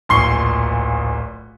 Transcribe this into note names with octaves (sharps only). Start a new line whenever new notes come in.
D1 A#1 C6 C#6 C7 G7